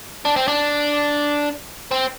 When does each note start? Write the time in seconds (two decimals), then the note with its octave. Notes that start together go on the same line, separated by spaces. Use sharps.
0.25 D4
0.36 C4
0.48 D4
1.91 C4